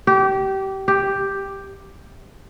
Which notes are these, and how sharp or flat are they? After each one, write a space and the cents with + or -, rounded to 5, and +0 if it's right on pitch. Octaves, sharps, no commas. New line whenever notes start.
G4 -25
G4 +5